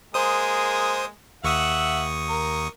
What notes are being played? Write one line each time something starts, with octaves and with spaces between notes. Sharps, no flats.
G#3 A#3 G#4 C5 D#6
D#2 E5 F#5 C#6 D#6
A#4